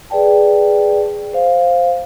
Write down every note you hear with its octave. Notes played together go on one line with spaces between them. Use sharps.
G#4 B4 D5 G5 A5
C5 F5